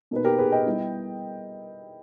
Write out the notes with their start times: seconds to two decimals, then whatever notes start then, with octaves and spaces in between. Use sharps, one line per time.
0.11 B2 A#3 D#4 B4
0.25 G4 A#4
0.38 G#4 B4
0.52 D#5 G5
0.66 G3 B3 E4